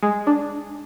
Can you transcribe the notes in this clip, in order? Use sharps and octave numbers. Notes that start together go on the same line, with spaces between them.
G#3
D4